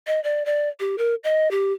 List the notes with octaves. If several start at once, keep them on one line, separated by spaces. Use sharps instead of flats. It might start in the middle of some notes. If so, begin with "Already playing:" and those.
D#5
D5
D5
G4
A#4
D#5
G4